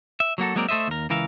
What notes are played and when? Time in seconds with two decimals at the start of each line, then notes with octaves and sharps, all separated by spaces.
0.20 E5
0.38 F#3 A#3 F#4 A4
0.55 F#3 G#3 A#3 C4 A#4 D5
0.69 A3 A4 C5 D#5 E5
0.88 D#2 A#4
1.10 C#2 E3 A#4 E5 F5